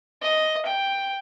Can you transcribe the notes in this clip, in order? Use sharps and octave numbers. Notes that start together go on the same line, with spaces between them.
D#5
G5